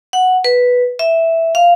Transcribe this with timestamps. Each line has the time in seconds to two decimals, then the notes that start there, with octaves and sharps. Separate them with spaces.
0.13 F#5
0.44 B4
0.99 E5
1.55 F5